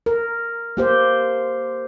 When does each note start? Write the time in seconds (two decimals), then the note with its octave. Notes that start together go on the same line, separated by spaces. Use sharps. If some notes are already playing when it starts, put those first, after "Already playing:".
0.06 A#4
0.77 A#3 G4 C5